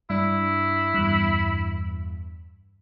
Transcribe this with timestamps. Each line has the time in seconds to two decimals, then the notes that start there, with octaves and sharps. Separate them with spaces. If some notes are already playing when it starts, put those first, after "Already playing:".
0.10 G2 D4 E4
0.94 E2 G2